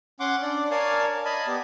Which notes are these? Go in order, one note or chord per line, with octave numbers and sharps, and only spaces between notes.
C#4 F#5 C6 D6
D4 D5
A#4 C#5 D5 F5 G#5 A5
D#5 G#5 A5 B5
B3 G4 D5